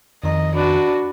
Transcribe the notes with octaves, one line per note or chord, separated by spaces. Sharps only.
F2 D#3 D#5 A#5
D4 F#4 B4